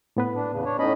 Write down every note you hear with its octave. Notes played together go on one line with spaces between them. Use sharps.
A2 B3 B4
D4
E2 C#3
D4 C#5
A2 C#4 D#4 D#5 B5